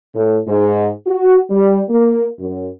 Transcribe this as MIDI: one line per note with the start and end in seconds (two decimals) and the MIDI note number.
0.14 0.39 45
0.46 0.88 44
1.06 1.36 66
1.49 1.82 55
1.88 2.24 58
2.38 2.68 42